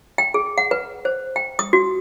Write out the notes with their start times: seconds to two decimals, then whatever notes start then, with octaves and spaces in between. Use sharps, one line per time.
0.18 G5
0.34 G#4
0.58 F#5
0.71 B4
1.05 C5
1.36 G5
1.59 D#6
1.73 F#4